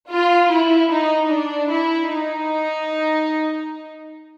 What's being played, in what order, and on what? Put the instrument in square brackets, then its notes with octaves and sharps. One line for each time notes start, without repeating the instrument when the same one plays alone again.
[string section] F4
E4
D#4
D4
E4
D#4